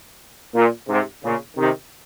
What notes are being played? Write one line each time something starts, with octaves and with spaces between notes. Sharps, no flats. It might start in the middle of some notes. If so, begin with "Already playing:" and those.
A#2
G#2 C3
A#2 C#3
C3 D#3